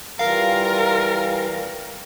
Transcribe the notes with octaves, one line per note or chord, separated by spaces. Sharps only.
E3 G3 F4 A#4 F5